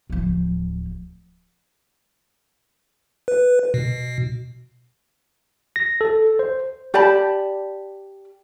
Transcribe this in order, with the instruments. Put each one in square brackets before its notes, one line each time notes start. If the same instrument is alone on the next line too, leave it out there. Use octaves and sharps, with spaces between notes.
[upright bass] D1 F3
[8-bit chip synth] B4
B2
[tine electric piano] A#6
A4
C5
[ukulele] G4 D5 A5 B5